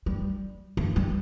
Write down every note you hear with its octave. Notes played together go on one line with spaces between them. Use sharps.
G3
A3
G3